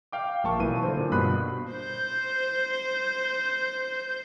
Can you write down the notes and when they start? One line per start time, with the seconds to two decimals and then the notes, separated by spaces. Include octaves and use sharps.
0.12 F5 G5 D6
0.43 A#1 A#3 A5 C#6
0.59 B1 E3 D#7
0.83 D3 C5
0.97 A#2
1.11 G2 B2 B5 D#6 F#6 C7
1.72 C5 G6